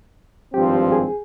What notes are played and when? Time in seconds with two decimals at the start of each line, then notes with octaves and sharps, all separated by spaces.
0.54 G#1 G2 F3 C4 G4
0.92 G#4